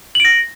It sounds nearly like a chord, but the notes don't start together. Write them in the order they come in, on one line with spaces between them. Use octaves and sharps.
F#7 D7 A#6